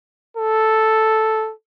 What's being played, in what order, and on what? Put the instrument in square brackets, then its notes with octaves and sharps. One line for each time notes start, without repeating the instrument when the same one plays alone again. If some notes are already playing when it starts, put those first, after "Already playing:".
[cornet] A4